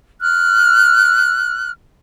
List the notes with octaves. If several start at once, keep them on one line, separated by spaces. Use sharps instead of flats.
F6 F#6